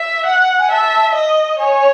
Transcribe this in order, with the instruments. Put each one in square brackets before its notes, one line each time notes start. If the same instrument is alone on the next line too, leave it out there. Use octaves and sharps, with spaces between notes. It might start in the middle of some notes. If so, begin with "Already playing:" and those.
Already playing: [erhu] E5
F#5
[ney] G#5
[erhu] E5 [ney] A5
[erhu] D#5
[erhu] C#5 [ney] G#5